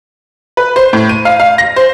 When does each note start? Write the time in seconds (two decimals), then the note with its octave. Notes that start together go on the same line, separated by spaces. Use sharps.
0.57 B4
0.76 C5
0.93 A2
1.09 D#7
1.25 F5
1.40 F5
1.58 A#6
1.76 C5